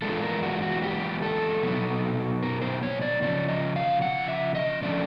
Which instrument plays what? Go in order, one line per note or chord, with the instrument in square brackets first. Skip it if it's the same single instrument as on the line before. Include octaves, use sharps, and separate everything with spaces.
[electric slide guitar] E3 G#3 B3 D4 F4 A4
A#4
F#4
F#4
G4
A4
B2 F#3 B3 D#4
A#4
C5
C#5
D5
C#3 F3 C#4 D5
D#5
F5
F#5
E5
D#5
D3 F3 A3 C#4 D5